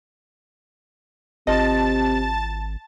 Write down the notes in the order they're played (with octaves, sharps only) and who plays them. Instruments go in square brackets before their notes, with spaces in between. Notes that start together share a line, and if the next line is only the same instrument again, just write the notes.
[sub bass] G#1 [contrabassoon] C3 [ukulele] F4 D#5 [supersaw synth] A5 A6